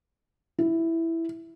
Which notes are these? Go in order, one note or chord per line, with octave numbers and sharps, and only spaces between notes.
E4